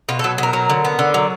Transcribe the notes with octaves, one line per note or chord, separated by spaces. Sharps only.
B2 F4
F#3 A4
B2 A#4
F#3
D3
B3
D3
F#3